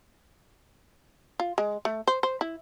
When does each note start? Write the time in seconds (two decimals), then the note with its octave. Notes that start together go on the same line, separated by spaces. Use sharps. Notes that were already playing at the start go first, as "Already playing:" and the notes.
1.40 F4
1.58 G#3
1.85 A3
2.07 C5
2.23 C5
2.41 E4